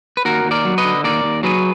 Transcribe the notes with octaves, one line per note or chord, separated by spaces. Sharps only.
B4
D#2 F#4 A#4
D#2
A#4 D5
F#3
B4 D#5
D3
D#2 A#4 D5
D#2
F#3 G#4 B4